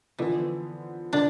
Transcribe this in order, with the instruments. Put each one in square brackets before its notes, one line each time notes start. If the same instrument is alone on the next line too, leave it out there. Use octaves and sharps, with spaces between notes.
[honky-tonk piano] D3 F3 B3 [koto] E3
[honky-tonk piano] D3 [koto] D4